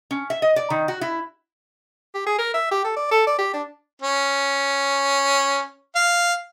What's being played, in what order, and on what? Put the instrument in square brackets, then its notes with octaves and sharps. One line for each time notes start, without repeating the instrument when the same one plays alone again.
[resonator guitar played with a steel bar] C#4
E5
D#5
D5
D#3
F#4
E4
[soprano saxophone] G4
G#4
A#4
E5
G4
A4
D5
A4
D5
G4
D4
[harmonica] C#4
F5